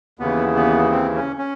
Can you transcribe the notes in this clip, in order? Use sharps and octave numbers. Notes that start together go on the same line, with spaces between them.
D#2 C#3 E3 B3
B3
C4
C#4
C#4